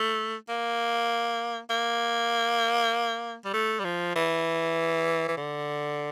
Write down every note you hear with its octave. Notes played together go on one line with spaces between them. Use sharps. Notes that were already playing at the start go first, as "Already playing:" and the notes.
Already playing: A3
A#3
A#3
G3
A3
G3
F3
E3
E3
D3